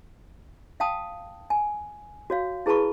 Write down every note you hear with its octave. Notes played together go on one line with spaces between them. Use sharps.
F5 G5 A5 D#6
G#5
F#4 C#5 F5
E4 G#4 B4 A5 B5 C#6